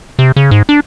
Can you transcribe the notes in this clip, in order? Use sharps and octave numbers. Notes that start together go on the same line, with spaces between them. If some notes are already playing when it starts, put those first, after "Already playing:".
C3
C#3
G#2
D4